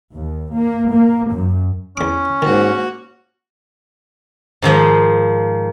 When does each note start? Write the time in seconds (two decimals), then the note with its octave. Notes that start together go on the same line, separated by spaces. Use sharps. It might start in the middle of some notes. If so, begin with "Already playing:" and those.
0.14 D#2
0.55 A#3
0.92 A#3
1.32 F#2
1.97 E2 C#4 D6
2.42 G#2 D#3 A#3 F#4
4.62 G#2 D#3 F3 D#5